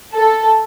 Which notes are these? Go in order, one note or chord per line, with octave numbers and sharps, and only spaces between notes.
A4